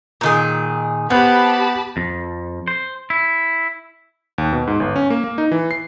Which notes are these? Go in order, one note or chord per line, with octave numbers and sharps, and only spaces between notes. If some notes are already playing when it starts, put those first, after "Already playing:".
A#2 D#3 G#4
B3 C4 G4 A5 B5 F#6
F2
C5
E4
D#2
B2
G#2
G1
C#4
A#3
A#3
D#4
E3
C7